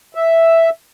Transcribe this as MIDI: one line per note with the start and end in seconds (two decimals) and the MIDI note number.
0.15 0.70 76